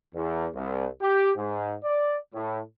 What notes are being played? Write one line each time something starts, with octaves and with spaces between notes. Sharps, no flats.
E2
C2
G4
G#2
D5
A2